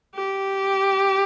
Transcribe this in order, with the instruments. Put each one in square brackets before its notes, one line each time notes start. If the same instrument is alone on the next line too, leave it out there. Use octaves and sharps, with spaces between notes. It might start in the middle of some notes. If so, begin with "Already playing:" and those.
[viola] G4